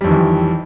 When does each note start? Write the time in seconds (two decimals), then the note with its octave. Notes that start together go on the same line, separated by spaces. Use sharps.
0.01 G3
0.04 F2
0.07 D#3
0.11 E3